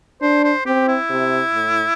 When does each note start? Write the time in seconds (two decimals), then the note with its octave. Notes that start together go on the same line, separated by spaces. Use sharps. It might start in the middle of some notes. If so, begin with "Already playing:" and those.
0.22 D4 C5
0.44 C5
0.66 C4 G4
0.88 E4
1.10 C3
1.54 A2